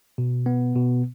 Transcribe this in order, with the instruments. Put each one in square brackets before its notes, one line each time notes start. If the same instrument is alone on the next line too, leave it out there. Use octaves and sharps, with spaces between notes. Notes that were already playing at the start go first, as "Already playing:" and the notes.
[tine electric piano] B2
B3
B2